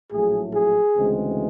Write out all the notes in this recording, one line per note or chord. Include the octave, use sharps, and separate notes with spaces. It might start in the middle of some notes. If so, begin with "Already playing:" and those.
A#1 A2 F#3 A3 G#4
G#4
D2 C#3 E3 G#3 C4